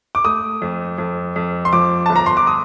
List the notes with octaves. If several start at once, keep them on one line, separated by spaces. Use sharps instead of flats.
D6
A3 D#6
F2
F2
F2
C6
F3 D6
G1 A5
A#5
C6
D6
D#6